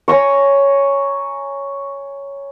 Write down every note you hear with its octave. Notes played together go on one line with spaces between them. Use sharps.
C#5 G#5 A#5 C#6